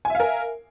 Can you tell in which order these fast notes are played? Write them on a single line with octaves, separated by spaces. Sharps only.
G#5 E5 F5 A#4